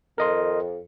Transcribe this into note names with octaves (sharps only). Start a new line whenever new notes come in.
F2 A#4 D#5 C6